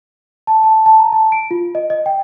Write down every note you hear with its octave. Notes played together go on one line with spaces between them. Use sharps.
A5
A5
A5
A#5
A5
D7
F4
D#5
D#5
G5